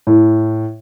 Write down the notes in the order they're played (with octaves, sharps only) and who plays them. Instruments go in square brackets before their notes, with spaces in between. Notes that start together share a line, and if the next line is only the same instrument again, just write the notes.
[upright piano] A2